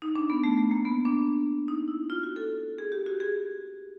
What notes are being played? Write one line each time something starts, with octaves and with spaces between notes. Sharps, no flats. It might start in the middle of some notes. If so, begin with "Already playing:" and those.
D#4
D4
B3
A3
A3
A#3
B3
D4
D#4
E4
F4
F#4
A4
G#4
G4
F#4
G#4